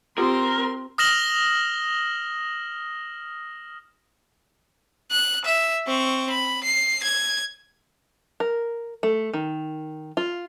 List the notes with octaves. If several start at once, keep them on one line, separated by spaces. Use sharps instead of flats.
C4 F4 G4 A#4 C6
D#6 F6 A#6 E7 F#7 G7
F#6
E5
C4 C#6
B5
C7
G#6
A#4
A3
D#3
F4